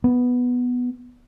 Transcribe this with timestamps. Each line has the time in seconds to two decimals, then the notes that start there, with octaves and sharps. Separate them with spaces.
0.04 B3